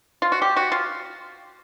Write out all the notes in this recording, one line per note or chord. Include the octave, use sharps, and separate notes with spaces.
F4
F#4
G4
F#4
F4